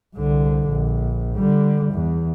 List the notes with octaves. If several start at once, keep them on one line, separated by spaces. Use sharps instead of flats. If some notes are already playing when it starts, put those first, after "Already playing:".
C2 D3
A#1
D3 G3
E2